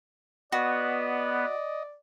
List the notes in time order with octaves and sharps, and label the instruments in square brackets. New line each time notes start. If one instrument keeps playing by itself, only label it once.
[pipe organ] B3 B4 [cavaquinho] F#4 [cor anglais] D5 [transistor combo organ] D#5